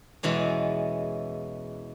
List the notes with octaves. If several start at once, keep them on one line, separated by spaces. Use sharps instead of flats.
E2 B2 E3 G#3 C#4